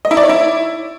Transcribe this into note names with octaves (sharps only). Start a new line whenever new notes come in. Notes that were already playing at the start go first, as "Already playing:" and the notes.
D#5
E4
D5
C#5
E4